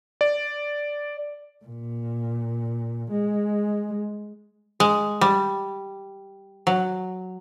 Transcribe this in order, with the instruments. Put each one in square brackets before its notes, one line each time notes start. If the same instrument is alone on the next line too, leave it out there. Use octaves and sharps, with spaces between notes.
[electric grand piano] D5
[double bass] A#2
G#3
[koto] G#3
G3
F#3